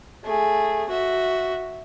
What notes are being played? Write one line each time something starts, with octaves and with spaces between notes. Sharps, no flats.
A3 G#4
F#4 E5